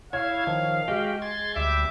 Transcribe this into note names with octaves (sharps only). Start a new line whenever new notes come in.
E4 C#5 F5 G#6
D#3 F3
G#3 F#4 G4 G5
C6 G#6 A6
D2 G3 E5 D6